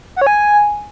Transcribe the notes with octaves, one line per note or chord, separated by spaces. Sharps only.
F#5
C#5
G#5